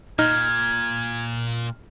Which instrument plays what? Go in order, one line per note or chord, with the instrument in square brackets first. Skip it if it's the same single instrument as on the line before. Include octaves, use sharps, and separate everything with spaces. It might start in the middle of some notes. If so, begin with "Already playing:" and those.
[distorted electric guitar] A#2 [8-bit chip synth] D#4 [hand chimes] F6 [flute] G#6